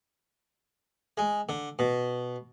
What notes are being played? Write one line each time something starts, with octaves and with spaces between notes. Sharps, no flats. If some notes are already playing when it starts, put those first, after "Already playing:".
G#3
D3
B2